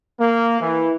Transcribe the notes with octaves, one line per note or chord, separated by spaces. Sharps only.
A#3
E3